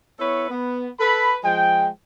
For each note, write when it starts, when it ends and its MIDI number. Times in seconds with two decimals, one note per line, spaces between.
0.20 0.49 59
0.20 0.49 64
0.20 0.49 69
0.20 0.49 71
0.20 0.49 73
0.50 0.88 59
0.99 1.37 69
0.99 1.37 71
0.99 1.37 83
1.44 1.89 53
1.44 1.89 56
1.44 1.89 79